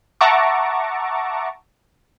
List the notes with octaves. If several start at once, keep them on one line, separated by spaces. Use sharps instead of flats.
E5 F#5 A5 A#5 C#6 D6